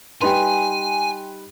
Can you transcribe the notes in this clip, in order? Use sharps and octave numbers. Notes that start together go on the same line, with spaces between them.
G3 D#4 B4 G5 G#5 C6